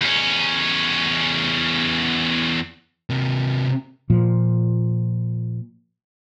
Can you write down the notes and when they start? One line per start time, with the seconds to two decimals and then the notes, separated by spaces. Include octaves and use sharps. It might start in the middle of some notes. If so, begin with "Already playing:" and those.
0.01 E2 C#4
3.10 C3 A#3
4.10 A#2 F3